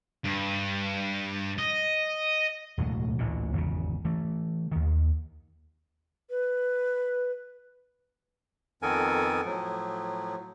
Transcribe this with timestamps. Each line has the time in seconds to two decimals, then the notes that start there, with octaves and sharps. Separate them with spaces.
0.25 G2
1.58 D#5
2.78 E1 D2 A2 F#3
3.18 A1 D2 A#2
3.53 G#1 E2 C#3
4.05 E3 A3
4.72 D#2 D#3
6.30 B4
8.82 F2 D#3 B3 A4 A#4 G#5
9.45 A2 F3 F#3